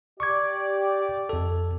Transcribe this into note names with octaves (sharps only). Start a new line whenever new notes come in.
G4 D5 C#6 D6 G#6
F2 A4